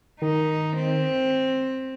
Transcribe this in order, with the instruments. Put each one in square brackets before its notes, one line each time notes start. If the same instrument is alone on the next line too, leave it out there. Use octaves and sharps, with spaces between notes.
[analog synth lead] D#3 [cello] D#4
[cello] C4